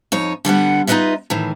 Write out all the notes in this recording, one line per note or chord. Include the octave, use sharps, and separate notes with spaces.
F2 D#4 C#5
D3 G3 B3 F#5
D#4 F4 G#4 B4 D#5 E5
A2 D#3 E3